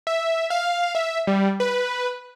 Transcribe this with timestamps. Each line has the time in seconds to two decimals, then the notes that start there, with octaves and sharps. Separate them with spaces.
0.07 E5
0.50 F5
0.95 E5
1.27 G3
1.60 B4